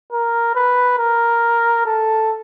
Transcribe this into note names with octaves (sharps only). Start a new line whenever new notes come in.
A#4
B4
A#4
A4